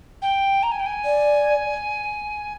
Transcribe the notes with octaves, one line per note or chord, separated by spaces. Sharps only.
G5
A#5
G#5
G5
G#5
D5